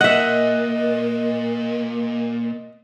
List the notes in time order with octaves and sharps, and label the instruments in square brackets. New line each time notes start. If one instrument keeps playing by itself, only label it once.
[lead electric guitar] A#2 [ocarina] A#4 [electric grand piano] D#5 F#6 [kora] E5 F#5